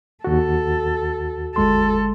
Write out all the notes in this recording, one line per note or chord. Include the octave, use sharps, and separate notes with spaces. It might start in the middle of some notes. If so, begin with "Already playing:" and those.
D#2 F#4 A4
G1 G#3 A4 C6